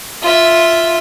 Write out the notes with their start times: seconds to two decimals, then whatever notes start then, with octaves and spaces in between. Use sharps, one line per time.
0.22 F4 E5